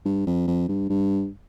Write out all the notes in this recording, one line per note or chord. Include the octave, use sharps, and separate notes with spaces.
G2
F2
F2
G2
G2